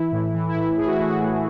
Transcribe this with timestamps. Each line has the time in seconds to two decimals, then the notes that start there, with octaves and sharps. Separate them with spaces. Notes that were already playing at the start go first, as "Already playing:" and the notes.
Already playing: E3 E4
0.12 A2
0.34 E3
0.48 E4
0.55 A2
0.77 A2 G#4
0.87 F#4
0.95 E4
0.99 A2
1.05 F#4
1.21 A2